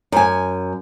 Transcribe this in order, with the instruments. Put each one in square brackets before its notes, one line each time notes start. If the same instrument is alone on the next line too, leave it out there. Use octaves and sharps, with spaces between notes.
[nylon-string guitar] F#2 G#5